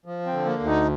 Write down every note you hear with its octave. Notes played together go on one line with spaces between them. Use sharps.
F3
C4
D3
A#3
D2
D#4